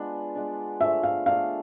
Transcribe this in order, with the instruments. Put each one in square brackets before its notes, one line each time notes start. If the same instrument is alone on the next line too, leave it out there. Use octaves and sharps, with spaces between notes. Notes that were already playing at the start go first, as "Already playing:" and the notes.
Already playing: [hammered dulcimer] G#3 B3 D4 F4
G#3 B3 D4
[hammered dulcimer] D3 F3 A3 [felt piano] E5
[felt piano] F5
[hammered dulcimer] D3 A3 D4 G#4 [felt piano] F5